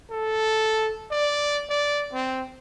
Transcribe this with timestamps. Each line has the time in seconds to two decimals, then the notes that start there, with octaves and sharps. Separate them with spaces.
0.11 A4
1.11 D5
1.69 D5
2.13 C4